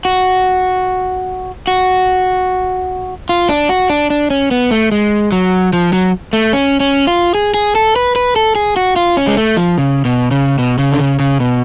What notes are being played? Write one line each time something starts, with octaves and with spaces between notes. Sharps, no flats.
F#4
F#4
F4
D4
F#4
D4
D4
C#4
B3
A3
G#3
F#3
F3
F#3
A3
C#4
C#4
F4
G#4
G#4
A4
B4
B4
A4
G#4
F#4
F4
C#4
G#3
A3
F3
C#3
B2
C#3
B2
C#3
D3
C#3
C#3
B2